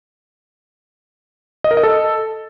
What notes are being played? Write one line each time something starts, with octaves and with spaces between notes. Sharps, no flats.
D#5
A#4
D#5
A4